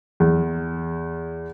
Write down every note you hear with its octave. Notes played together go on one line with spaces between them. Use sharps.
E2